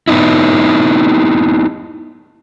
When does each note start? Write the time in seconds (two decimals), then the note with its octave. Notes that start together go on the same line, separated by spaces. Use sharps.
0.08 B3 D#4 E4